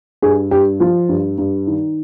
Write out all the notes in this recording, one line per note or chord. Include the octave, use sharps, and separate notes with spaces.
G2 G#4
G2 G4
F3 F4
G2
G2
D#3